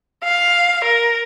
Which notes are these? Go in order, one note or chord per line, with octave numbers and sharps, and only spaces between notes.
F5
A#4